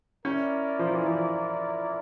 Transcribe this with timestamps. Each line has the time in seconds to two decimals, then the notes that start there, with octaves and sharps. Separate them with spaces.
0.25 C#4 E4 A#4 D5
0.79 F3
0.93 E3
1.07 F3